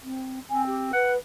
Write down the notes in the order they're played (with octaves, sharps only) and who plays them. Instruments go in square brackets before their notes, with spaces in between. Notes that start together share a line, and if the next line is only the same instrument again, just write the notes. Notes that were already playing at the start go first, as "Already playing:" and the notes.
[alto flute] C4
[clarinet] C4 [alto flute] G#5
[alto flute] G4
[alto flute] B4 [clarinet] F#5